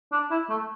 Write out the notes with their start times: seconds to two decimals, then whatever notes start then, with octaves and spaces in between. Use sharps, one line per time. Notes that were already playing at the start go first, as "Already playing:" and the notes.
0.12 D4
0.31 E4
0.49 A3